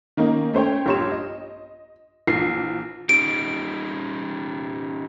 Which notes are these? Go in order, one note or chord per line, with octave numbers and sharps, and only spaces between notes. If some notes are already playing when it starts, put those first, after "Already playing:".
D#3 A#3 C#4 D#4
A3 C#4 C5 C#5 G5
A#1 G2 G4 C#5 C6 E7
D#5
A#1 E3 C7
C#4 D#4 G4 D7